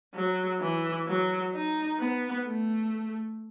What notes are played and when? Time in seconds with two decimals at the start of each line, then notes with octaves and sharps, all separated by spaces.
0.14 F#3
0.60 E3
1.07 F#3
1.54 D#4
2.00 B3
2.46 A3